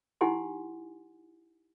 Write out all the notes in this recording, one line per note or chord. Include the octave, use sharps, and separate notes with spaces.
D#4 E4 G4 F#5 G#5 C6